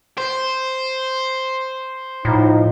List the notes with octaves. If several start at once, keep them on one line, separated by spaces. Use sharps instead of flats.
C5
A2 F3 D#4